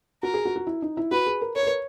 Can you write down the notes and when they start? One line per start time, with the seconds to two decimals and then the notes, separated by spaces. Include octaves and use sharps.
0.23 F#4 A#4
0.34 G#4
0.45 F#4
0.56 F#4
0.67 E4
0.82 D#4
0.97 E4
1.11 F#4 B4
1.26 G#4
1.42 A#4
1.56 A#4 C#5
1.63 B4
1.67 A#4